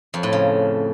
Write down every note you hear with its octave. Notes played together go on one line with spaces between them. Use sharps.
F2
A2
C#3